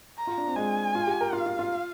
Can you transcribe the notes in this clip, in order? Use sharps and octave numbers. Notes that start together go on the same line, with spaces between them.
A#5
F4
D4
C4
G#3 G#5
F4
G4
A#4
F4 F5
F4
F4